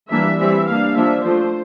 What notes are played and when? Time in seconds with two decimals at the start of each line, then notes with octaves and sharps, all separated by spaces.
0.10 E3 G3 A#3 D4 E5
0.39 E3 G3 C4 E5
0.67 G3 A#3 D4 F5
0.96 F3 A#3 D4 E5
1.24 F3 A3 D4 C5